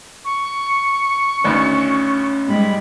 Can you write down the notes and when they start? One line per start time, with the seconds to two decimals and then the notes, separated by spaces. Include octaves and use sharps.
0.24 C#6
1.44 G#1 D2 C#4
2.47 G#2 G3 G#3 B5